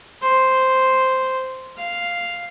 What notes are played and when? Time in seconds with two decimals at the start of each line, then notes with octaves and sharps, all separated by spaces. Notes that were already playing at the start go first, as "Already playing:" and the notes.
0.22 C5
1.77 F5